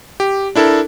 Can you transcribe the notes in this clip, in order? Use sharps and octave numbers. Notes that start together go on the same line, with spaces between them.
G4
D4 E4 A4 A#4 A5